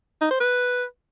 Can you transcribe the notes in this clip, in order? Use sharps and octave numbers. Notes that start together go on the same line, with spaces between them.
D#4
C5
B4